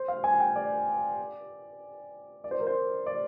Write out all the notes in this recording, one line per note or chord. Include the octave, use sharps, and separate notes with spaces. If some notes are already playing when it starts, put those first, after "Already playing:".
Already playing: C5
F5
G#5
G5
D5
D5
C5
A#4
C5
D5